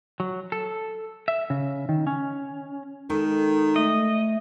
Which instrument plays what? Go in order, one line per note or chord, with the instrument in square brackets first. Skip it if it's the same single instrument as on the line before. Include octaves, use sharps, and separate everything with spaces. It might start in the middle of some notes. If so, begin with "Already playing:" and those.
[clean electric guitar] F#3
A4
E5
C#3
D#3
C#4
[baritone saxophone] D#3 [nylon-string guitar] G#3 A4
[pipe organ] A3 [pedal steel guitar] D#5